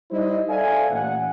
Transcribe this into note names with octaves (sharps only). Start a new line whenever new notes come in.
G3 D#4 E4 C5 D5 D#5
A4 D5 E5 F5 G#5
A1 A#2 F#5